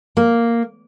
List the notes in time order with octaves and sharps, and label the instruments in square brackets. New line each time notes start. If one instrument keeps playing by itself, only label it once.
[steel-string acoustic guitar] A#3